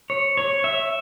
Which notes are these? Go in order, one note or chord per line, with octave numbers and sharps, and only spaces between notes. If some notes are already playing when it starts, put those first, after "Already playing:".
C#5
C#5
E5